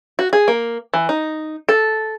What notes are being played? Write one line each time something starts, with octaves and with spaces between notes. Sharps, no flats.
F#4
G#4
A#3
E3
D#4
A4